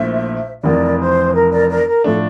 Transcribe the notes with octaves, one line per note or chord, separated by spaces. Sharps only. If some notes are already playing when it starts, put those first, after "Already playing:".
Already playing: A#1 A#2 A3 E4 C5 E5
F1 F2 E3 A#4 D5
C5
A#4
A#4 D5
A#4 D5
A#4
A2 F3 A3 D4 A4